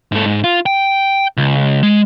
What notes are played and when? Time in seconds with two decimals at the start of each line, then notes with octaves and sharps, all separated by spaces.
0.12 G#2 A4
0.25 G#2
0.44 F4
0.66 G5
1.37 C#2
1.83 G#3